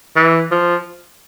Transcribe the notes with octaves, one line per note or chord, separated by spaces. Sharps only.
E3
F3